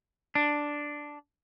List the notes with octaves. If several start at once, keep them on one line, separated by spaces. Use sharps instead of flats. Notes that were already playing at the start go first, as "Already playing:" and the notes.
D4